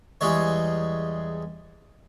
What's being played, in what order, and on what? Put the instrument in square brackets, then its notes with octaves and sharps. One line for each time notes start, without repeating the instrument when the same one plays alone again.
[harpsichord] E2 G3 G#3 C#5